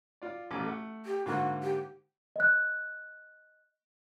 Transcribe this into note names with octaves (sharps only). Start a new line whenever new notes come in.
F4 D5
A1 B2 D6
A3 F#5
G4
G#2 D3 A#3 F#4
G4
D#5 F#6